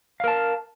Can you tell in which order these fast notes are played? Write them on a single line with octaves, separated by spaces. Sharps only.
F5 A#4 A5